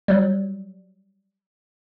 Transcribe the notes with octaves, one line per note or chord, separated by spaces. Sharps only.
F#3 G3